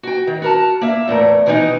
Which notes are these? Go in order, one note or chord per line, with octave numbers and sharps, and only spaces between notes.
F#4 G5
D#3
F#4 A#4 A5
A#3 E5
E2 A2 A3 A#4
B2 D#3 E3 C4 D#4 D#5